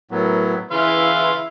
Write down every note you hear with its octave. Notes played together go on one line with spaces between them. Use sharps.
A2 F#3 B3 A#4
C#3 E3 E4 B4 F5 C6